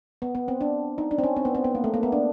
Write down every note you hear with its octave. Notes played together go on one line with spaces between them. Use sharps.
B3
B3
C4
D4
D#4
D4
C4
C#4
C4
B3
C4
B3
A#3
A3
A#3
B3
D4